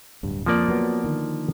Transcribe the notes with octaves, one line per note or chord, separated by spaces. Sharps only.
D1 G2
F2 F3 A#3 D5
F#3 B3
D3 D#3